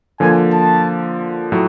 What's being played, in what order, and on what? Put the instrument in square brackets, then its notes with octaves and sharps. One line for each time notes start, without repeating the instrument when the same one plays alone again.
[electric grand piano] D3 F3 A#3 [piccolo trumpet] G#5
[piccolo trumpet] A5
[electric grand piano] A2 F#3